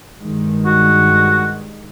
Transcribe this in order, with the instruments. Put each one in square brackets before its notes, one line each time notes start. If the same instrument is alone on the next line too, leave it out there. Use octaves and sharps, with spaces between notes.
[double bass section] G2 D#3 G#3
[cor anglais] F#4